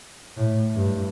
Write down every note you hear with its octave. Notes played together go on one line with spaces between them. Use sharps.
A2
G2